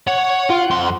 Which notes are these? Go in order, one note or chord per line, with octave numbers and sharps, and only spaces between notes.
C#5 F#5
F4
F2 C6